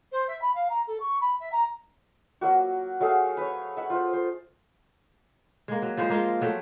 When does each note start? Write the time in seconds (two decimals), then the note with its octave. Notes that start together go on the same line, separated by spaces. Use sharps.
0.12 C5
0.28 E5
0.42 B5
0.54 F5
0.69 A#5
0.87 A4
1.00 C#6
1.21 B5
1.40 E5
1.52 A#5
2.41 F#3 A#3 F#4
3.00 F#3 A3 G#4 F5
3.37 B4 C#5
3.77 E5 F#5
3.90 F4 C5
4.13 C5
5.68 G#3 A#3
5.82 F#3
5.97 F3 G#3 C5
6.09 G#3 A#3 F4
6.41 F#3 A3 G5